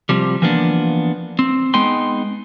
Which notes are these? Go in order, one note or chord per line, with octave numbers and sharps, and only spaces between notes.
C3 F3 G3
E3 F3 A#3 B3 D4
C4
G#3 B3 D#4 G5 C6